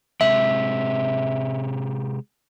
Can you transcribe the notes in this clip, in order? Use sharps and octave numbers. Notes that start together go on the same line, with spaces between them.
C3 G#3 E5